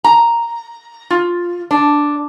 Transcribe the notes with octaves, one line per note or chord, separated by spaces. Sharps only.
A#5
F4
D4